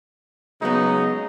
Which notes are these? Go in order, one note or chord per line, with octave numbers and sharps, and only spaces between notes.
C#3 F#3 G#3 B3 D#4